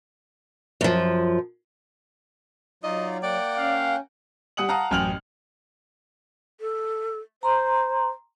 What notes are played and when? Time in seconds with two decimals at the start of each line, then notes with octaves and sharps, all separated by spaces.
0.81 F#2 F3
2.84 F#3 D#4 F4 D5 D#5
3.23 A#3 D5 F#5 G5
3.58 C#4 F5
4.57 G3 F#5 D#6 C#7 F#7
4.68 F5 F#5 A5 A#5 D#6
4.91 A1 F#2 G5 F6 F7 F#7
6.61 A4
7.43 C5 A#5 C6